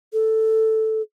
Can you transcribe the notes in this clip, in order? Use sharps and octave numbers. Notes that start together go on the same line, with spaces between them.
A4